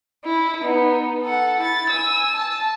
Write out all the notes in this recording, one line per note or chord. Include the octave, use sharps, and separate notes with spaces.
E4
B3 D#4
A4 F#5
E4 A6
G#5 E6
A5